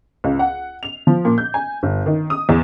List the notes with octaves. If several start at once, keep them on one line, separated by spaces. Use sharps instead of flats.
C#2
F#5
F7
F3
A#2
G6
G#5
G1
D#3
D#6
E2